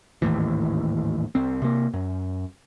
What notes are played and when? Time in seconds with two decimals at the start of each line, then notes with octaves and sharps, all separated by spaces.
0.22 G#1 D#2 A2 E3
1.35 C2 C3 C4
1.62 C3 A#3
1.94 F#2